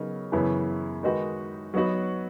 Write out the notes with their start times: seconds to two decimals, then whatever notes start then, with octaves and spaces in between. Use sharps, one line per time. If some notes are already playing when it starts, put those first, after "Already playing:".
Already playing: C#3 F#3 B3 D#4 A#4
0.32 F#2 C#3 E3 B3 E4
1.03 D#3 G#3 D#4 F#4 B4
1.74 F#3 B3 D#4 F#4 B4